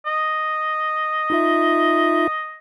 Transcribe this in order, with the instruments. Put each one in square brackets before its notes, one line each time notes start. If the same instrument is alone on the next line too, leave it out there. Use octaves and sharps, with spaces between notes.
[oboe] D#5
[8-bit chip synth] D#4 F4 E5